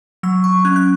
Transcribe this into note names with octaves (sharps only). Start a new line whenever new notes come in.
F#3 E6
C#6
C#4 F#6
F#6